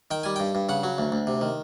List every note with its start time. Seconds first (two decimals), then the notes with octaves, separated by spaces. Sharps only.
0.11 D#3 G5
0.23 G3 G#5
0.36 G2 G5
0.55 G2
0.69 C#3 F#5
0.84 F#3
0.98 D2
1.12 D2
1.27 C3
1.41 D#3